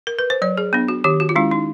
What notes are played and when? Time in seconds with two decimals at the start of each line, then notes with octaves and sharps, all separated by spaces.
0.07 A#4
0.19 B4
0.30 C5
0.42 F#3 C#5
0.57 G#4
0.73 B3 D4
0.88 F#4
1.04 D#3 G4
1.20 F#4
1.29 F4
1.36 G#3 C#4 E4
1.51 D#4